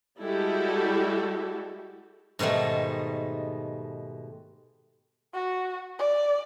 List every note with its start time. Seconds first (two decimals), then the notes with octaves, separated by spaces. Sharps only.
0.20 G3 G#3 E4 F#4 G4 A4
2.39 G#2 B2 D#3 G3 A3
5.34 F#4
5.99 D5